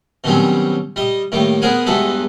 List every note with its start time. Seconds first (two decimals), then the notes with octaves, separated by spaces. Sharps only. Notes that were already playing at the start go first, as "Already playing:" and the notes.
0.24 B2 D#3 F#3 G3 C4 C#4
0.96 G3 D#5
1.32 A2 D#3 G3 A#3
1.62 B3 G#4 A#4 C5 F#5 G#5
1.86 E2 G2 G#3 F#4 A4 B4